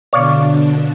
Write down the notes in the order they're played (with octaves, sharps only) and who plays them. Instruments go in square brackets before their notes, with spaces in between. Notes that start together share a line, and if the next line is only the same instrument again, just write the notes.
[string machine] B2 D3 D4 [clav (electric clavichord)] C#5 D5 F5